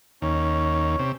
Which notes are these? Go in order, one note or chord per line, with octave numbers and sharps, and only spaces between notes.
D#2 C#4
C3